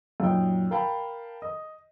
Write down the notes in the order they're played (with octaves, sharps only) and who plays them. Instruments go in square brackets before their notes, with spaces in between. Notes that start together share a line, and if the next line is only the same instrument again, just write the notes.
[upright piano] F#2 A#2 D#4 G5
A#4 F5 G5 A5 B5
D#5